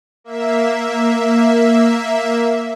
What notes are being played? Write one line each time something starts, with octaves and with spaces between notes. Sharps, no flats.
A#3 E5